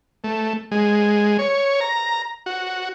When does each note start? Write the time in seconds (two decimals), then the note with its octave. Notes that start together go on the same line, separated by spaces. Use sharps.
0.24 A3
0.71 G#3
1.39 C#5
1.81 A#5
2.46 F#4